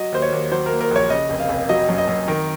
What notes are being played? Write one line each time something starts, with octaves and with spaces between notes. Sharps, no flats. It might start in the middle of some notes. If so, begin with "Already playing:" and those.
Already playing: F#3 D#5
D#2 C5
C#5
D#2
F#3 C5
A#4
A#3
A#4
A#1
C#5
C#3 D#5
F1
F5
F1
F#3 D#5
F#2
D#5
F#2
D#3 A#4